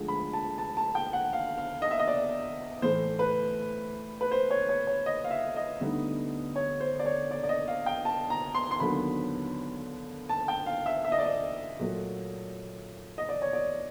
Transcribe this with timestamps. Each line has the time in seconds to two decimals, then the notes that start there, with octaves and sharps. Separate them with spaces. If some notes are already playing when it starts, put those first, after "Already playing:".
Already playing: D2 D3 F3 G#3
0.08 B5
0.33 A5
0.58 A5
0.77 A5
0.95 G5
1.13 F#5
1.33 F5
1.58 F5
1.82 D#5
1.91 E5
1.99 D#5
2.08 D5
2.82 A2 E3 A3 C5
3.19 B4
4.21 B4
4.31 C5
4.51 C#5
4.69 C#5
4.87 C#5
5.06 D#5
5.24 F5
5.31 E5
5.56 D#5
5.81 D2 D3 G3 B3 D#4
6.56 C#5
6.80 C5
7.00 D5
7.06 C#5
7.31 D5
7.44 D5
7.49 D#5
7.68 F5
7.86 G5
8.05 A5
8.30 A#5
8.55 C6
8.71 C6
8.80 D#2 D3 F#3 B3 B5
10.29 A5
10.48 G5
10.66 F5
10.86 E5
11.04 E5
11.12 D#5
11.19 D5
11.26 D#5
11.79 A#2 F#3 A3
13.18 D#5
13.29 D5
13.42 C#5
13.53 D5